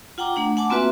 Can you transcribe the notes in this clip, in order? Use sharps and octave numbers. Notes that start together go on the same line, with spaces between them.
F4 F#5 G5 A#5 D6
A3 D4 F#5
F#5 G#5 A5 D6
A#3 C4 F4 F#4 B4 E5